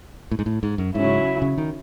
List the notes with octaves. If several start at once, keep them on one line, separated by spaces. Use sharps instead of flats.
A2
G#2
A2
G#2
F#2
G#2 C#3 F#3 C#4 E4
C#3
D#3